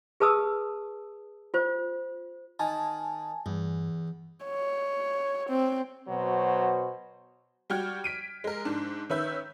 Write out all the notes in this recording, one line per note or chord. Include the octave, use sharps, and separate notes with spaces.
G#4 B4 A5 D#6 E6
F4 C5
D#3 G#5 A5
E2 G2
C#5
C4
B2 F#3 F#4 C5
G3 F#4 G5 F6 G#6
B6 D7 D#7
G#3 A#4
G#2 D4
D#3 C#4 B4 E5 E6 G6